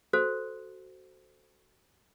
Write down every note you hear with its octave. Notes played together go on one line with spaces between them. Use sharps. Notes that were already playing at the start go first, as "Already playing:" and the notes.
F#4 A4 C5